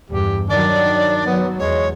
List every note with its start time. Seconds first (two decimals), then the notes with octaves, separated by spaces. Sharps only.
0.10 E2 G2 G4
0.49 D#3 F#3 D4 D5
1.26 F#3 B3
1.59 E2 G#3 C#5